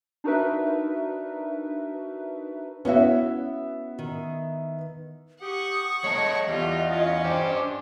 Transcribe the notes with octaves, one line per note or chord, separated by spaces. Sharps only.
D4 D#4 F#4 A#4 B4 E5
B3 C#4 E4 F#4 E5
D#3
G4 F#5 C#6 D#6
G#3 A4 C#5 D#5
E2 G3 F4
C#4 F4
D4 G4 C5